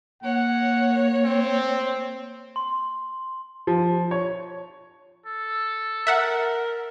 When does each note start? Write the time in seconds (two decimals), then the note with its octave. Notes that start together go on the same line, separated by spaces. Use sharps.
0.23 A#3 C#5 F#5
1.24 C4
2.56 C6
3.67 F3
4.11 C#5
5.26 A4
6.07 A#4 E5 F#5